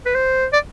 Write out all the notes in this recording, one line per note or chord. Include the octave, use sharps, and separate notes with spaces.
B4
C5
D5